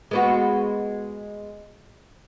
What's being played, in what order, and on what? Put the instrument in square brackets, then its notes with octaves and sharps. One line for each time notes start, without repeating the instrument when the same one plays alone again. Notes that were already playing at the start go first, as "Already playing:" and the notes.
[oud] G#3 B3 F#4